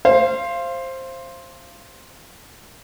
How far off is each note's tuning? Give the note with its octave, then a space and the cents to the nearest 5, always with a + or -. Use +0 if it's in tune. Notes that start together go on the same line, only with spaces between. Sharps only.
C5 +15 F5 -25